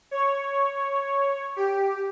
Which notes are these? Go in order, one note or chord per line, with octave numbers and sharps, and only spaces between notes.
C#5
G4